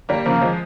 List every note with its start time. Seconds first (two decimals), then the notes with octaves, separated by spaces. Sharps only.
0.09 G3 A#3
0.26 C#3 F3 A#3
0.41 F3 G#3